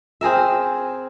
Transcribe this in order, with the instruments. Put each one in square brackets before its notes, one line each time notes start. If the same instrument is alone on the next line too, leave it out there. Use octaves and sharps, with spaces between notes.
[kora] C4 G#4 A#4 E5